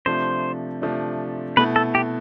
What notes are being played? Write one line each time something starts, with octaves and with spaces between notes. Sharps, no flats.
C3 F3 A3 D4 C5
C3 F3 A3 D4
B2 A3 E4 B4
A4
G4